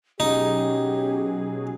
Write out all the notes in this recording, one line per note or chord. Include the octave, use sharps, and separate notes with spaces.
B2 F#3 C#4 D#4 G4 G#4